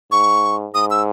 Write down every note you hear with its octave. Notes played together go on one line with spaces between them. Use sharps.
G#2 C#6
G#2 D#6
E6